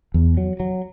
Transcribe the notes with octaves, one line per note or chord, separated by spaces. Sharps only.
E2
F#3
F#3